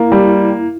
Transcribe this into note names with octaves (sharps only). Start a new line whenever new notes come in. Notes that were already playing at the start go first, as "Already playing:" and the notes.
Already playing: A#3 E4
G3